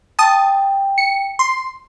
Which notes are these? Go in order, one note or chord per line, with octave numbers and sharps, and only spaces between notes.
G5 A5 D#6
C#7
C6